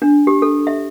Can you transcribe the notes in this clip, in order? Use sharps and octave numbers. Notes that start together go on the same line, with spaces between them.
D4
G4
A4
E5